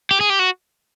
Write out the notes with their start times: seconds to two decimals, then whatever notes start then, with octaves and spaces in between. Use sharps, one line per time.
0.11 G4
0.20 G#4
0.30 G4
0.39 F#4